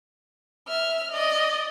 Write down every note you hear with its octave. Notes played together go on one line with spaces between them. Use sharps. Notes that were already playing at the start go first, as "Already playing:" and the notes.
E5 F6
D5 D#5